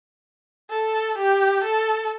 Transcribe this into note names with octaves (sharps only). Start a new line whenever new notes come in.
A4
G4
A4